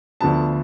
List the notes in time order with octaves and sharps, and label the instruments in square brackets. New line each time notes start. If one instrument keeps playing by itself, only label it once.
[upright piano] D2 D3 F3 B3 A5